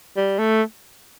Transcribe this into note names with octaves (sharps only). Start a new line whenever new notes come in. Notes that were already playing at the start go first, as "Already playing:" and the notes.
G3
A3